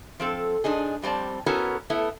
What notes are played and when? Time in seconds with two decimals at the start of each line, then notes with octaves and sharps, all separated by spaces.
0.20 F3 C4 A4
0.64 G#2 D4 D#4 G#4
1.02 F2 G3 C4 D5 A5
1.46 B3 C#4 E4 F#4 A4 A#4
1.90 A3 B3 E4